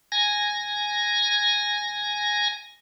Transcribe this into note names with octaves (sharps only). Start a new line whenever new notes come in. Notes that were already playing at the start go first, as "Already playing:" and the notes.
G#5 A#6